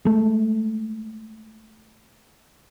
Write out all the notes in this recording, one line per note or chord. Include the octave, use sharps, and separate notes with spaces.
G#3 A3